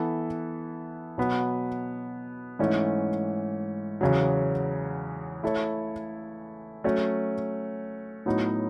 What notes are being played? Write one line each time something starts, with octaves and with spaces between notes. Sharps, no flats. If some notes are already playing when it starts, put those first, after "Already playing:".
Already playing: E3 B3 E4 A4
B2 F#3 B3
G#2 E3 A3 C#4
E2 C#3 F#3
A3 E4 A4 C#5
F#3 A3 C#4
A2 F#3 B3 D#4